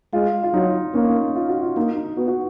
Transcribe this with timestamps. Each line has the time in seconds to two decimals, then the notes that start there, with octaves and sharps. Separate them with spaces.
0.13 G#3 F4
0.43 F4
0.54 F#3 D#4
0.94 A#3 C#4
1.36 F4
1.49 F#4
1.62 F4
1.76 A#3 D#4
1.97 D#4
2.17 B3 F#4
2.28 F#4